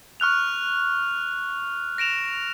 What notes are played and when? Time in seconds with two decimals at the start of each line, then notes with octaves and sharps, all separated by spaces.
0.20 C#6 F6 F#6 F7
1.98 A#6 D7 E7 F7